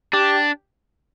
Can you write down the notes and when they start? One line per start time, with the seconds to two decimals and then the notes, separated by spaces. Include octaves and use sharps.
0.13 D4 G4